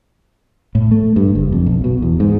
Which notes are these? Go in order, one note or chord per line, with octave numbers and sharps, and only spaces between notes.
A2
A3
G2
F#1
F2
B1
B2
E2
G#2